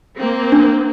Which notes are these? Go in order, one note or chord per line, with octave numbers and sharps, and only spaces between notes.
A#3 C4
D4